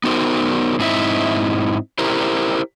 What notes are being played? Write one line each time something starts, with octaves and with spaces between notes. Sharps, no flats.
B3 D#4 F#4 A#4 C5
G#2 C4 D#4 E4 G#4 E5
E4 G4 A#4 C5